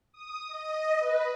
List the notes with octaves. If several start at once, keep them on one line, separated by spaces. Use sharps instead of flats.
D#6
D#5
B4